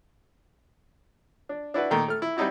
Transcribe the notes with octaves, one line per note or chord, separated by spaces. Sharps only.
D4
D4 E4 F#4 B4
A#2 D#3 A3 A#3
A3 F6
E4
G3 C4 D#4 E4 F#4